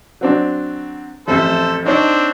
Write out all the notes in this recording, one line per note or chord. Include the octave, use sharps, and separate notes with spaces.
F#3 C4 D4
A1 F2 A4 C5 E5
C4 D4 D#4 C#5